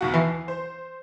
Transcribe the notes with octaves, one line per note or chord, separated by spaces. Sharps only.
D#2 B2 F#4
E3 C7
C5